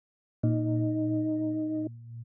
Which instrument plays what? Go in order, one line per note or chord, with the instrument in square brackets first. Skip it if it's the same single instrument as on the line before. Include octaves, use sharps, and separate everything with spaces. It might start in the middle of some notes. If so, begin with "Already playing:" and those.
[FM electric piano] A#2 [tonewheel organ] D#4